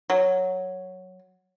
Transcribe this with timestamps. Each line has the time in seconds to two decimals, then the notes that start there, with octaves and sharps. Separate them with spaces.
0.10 F#3